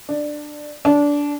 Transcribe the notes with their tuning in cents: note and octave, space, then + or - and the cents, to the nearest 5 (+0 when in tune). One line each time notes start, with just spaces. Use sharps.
D4 +15
D4 -15